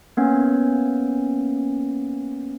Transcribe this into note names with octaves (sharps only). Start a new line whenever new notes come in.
A#3 B3 C#4